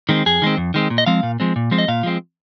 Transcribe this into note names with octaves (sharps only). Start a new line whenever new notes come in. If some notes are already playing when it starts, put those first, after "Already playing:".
D#3 G#3 C4
F2 G#4
D#3 G#3 C4
F2
D#3 G#3 C4
A#2
D#5
F3 G#3 C4 F5
A#2
F3 G#3 C4
A#2
F3 G#3 C4
D#5
A#2 F5
F3 G#3 C4